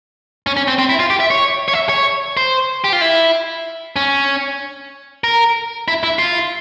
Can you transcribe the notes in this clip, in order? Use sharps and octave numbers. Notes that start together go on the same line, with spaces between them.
C#4
C#4
C4
C4
E4
F4
G4
E5
C#5
C#5
E5
C#5
C5
G4
F4
E4
C#4
A#4
E4
E4
F4